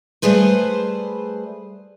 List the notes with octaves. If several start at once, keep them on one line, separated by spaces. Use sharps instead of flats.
G3 A3 G#4 B4 C5